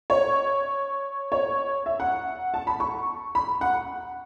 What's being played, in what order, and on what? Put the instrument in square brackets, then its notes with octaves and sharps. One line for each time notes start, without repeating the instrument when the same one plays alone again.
[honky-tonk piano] C#5
C#5
E5
F#5
A5
B5
C#6
B5
F#5